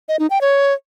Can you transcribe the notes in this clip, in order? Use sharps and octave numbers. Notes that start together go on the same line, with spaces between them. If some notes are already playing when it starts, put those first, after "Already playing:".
D#5
D#4
G5
C#5